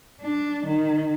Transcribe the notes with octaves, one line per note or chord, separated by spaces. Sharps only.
D4
D#3